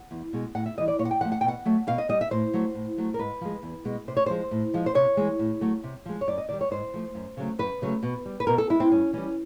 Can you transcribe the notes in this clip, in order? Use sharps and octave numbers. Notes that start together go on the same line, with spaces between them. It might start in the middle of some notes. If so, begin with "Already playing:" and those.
Already playing: F#5
E2
B2 G#3
A2 F#5
E5
E3 G3 D#5
D5
A#2 C#5
F#5
G5
F3 A3 F#5
F#5
B2 G5
F#5
F#3 A3
B2 F5
D#5
G3 D#5
E5
A2 C5
F#3 A3
A2
F#3 A3
A#4
G#2 B4
F3 G#3
E2
B2 G#3
C3 C5
C#5
F3 G#3 C5
A2
F3 G#3
C5
C3 C#5
E3 G#3
A2
F#3 A3
C3
F3 G#3
C#5
F#2 D5
D#5
D#3 G3 D5
C#5
G#2 C5
F3 A3
F#2
C#3 F#3 A3
F#2 B4
C#3 F#3 A3
B2
G3
B4
B2 A#4
A4
G#3 E4
C4
G2 C#4
E3 G3 C#4